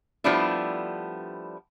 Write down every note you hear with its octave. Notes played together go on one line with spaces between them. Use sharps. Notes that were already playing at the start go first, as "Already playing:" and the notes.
F3 G3 A3 B3 D4 E4